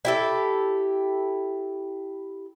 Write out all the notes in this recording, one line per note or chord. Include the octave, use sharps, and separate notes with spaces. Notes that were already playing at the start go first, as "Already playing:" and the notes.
E4 G4 A4